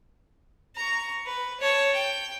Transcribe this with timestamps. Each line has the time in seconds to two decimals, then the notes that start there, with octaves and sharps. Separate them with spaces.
0.76 A#5 C#6
1.26 B4
1.60 C#5 A5
1.93 G5